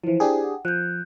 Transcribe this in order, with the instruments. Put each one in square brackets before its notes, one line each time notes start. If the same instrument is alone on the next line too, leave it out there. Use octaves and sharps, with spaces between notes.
[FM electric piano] E3 F3 [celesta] E4 C5
[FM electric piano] D4 G4 G#4
[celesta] F#5
[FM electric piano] F3 [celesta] F#6 G6